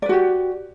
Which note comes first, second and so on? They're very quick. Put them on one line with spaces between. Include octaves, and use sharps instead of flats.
D5 B4 F#4 G4